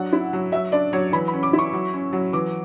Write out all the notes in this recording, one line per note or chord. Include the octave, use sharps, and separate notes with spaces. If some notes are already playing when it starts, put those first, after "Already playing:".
Already playing: F#3 D4 F#5
E4
F#3
F#3 E5
D4 D5
F#3 C#5
E3 B5
B5
C#4
D6
E4
C#6
F#3
C#4
F#3
E3 D6